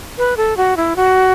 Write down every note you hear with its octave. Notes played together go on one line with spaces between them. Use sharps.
B4
A4
F#4
E4
F#4